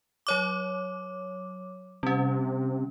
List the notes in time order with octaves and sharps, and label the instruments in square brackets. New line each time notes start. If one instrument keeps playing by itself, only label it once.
[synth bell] F#3 C#5 D6
[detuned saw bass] C3 [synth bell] G3 C#4